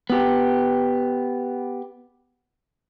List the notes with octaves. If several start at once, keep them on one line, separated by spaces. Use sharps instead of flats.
B3 G4